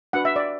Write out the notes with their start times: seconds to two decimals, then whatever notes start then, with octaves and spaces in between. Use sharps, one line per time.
0.13 D4 F#4 B4 F#5
0.25 E5
0.36 D5